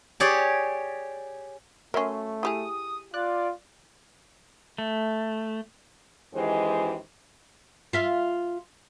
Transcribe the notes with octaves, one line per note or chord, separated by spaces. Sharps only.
G4 G#4 C#5 D5
F#3 A3 C#4 A#4 E5 C6
E4 G4 G#4 D#6
F4 D5 F#6
A3
F#2 D#3 E3 G#3 G4 C5
F4 E5 F5